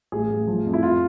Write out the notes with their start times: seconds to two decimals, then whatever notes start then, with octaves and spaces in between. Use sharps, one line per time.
0.12 A1 G#4
0.30 A1
0.47 F3
0.66 F2
0.73 E4
0.83 F4